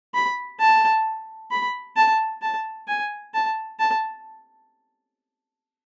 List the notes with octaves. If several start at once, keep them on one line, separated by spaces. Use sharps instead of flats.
B5
A5
B5
A5
A5
G#5
A5
A5